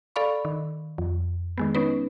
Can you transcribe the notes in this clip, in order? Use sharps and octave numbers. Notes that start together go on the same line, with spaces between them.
A4 D5 F5 B5 C#6
D#3
F2
D#3 G#3 B3
B3 C#4 D#4 B4